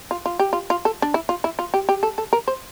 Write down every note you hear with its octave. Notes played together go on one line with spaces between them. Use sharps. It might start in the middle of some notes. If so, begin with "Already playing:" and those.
F4
F4
G4
F4
F4
A4
D4
E4
F4
E4
F4
G4
G4
A4
A4
A#4
C5